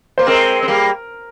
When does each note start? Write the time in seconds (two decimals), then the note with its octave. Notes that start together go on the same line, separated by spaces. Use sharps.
0.18 A#3 C5
0.27 G#3 C4 A#4
0.62 C4
0.68 G3 A#3